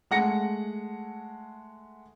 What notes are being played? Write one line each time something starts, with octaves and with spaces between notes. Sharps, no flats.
G#3 A3 F#5 A#6 C#7